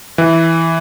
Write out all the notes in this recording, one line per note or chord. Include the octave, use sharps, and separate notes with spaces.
E3